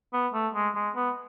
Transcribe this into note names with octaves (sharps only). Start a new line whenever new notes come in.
B3
A3
G#3
G#3
B3